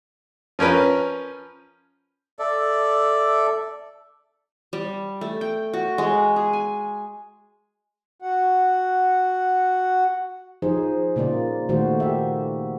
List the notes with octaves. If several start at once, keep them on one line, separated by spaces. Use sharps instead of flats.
F3 C#4 A#4 B4
A4 D5 E5
G3
A3
G5
F#4
G#3
G#4
G#5
F#4 F#5
F3 D#4 G#4 C5
A#2 C#3 A#3 F4 D5
A#2 D#3 A3 A#3 F#4 C5
G4 E5